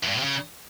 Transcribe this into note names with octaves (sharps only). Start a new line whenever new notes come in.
E2
G2
A2
C3
C#3